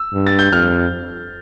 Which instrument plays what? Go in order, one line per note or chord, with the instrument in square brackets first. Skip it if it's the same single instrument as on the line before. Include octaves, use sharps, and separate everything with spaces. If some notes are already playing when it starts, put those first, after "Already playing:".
Already playing: [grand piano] E6
[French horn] G2
[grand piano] A6
G6
[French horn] F2 [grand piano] F6